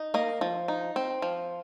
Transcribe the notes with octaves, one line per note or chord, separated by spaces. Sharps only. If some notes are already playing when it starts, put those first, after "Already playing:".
Already playing: D#4
A#3 D#5
F3
D#4
C4
F3